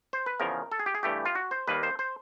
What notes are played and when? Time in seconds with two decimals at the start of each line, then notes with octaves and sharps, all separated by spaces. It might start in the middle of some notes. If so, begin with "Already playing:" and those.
0.13 C5
0.26 B4
0.40 E2 C#3 F3 A#4
0.72 A4
0.79 G#4
0.86 G4
0.95 G#4
1.03 G2 E3 A3 G4
1.26 F4
1.35 F#4
1.51 C5
1.67 D#2 D#3 G3 A#3 B4
1.83 C5
1.99 C5